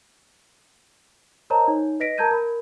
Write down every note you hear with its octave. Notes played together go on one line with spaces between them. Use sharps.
A#4 C5 C#5 D#5 A5 A#5
D#4 C#5
B4 D#5 A#6 B6 D7
A#4 A5 A#5 G6 G#6 D#7
A#4 B5